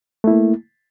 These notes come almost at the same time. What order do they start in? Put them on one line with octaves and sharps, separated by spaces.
A3 E4 A#3